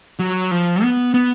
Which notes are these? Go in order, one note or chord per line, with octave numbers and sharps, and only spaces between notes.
F#3
F3
B3
B3